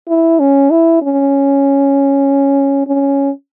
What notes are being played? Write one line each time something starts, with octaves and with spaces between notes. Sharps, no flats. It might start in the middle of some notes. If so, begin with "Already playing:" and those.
E4
C#4
E4
C#4
C#4